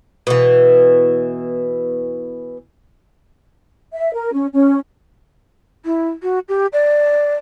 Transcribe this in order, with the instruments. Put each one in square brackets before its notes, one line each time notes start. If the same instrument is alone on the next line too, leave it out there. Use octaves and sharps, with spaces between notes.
[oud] B2 E3
[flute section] E5
A#4
C#4
C#4
[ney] E4
F#4
G4
D5